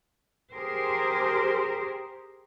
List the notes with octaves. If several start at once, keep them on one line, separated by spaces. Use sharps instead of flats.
G4 G#4 A#4 C5